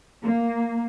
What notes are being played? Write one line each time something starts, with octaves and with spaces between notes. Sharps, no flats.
A#3